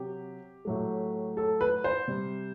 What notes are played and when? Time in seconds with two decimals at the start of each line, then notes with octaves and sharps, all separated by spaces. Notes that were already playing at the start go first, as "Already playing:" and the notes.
Already playing: C3 F#3 G4
0.65 A2 F#3 A3
1.37 A4
1.61 B4
1.84 C5
2.08 C3 G3